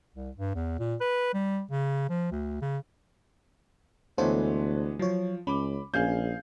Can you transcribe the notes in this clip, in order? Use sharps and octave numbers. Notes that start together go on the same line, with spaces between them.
C2
G2
E2
A#2
B4
G3
C#3
F3
D2
C#3
D2 E3 G#3 B3 A4 C5 C#5
F3 F#3 C#5
C#2 C#4 B5 D6
A#1 C#4 G#4 F5 G6